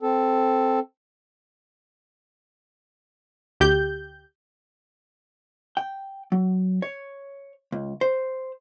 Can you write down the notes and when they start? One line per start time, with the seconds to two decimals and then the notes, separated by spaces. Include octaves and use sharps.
0.02 C4 A4
3.60 D2 G4 G6
5.77 G5
6.32 F#3
6.82 C#5
7.72 C#2
8.01 C5